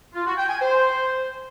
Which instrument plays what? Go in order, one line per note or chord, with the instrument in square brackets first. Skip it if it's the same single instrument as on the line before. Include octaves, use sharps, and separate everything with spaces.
[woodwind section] F4
F#4
G5
G#5
C5